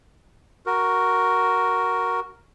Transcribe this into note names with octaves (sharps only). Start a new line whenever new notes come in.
F#4 A#4